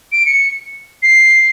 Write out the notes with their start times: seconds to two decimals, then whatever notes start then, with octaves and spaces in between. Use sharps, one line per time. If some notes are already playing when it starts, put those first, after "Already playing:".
0.12 D7
0.26 C#7
1.03 C7